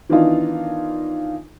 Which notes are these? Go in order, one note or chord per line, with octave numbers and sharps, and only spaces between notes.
D#3 E3 B3 D4 D#4 F4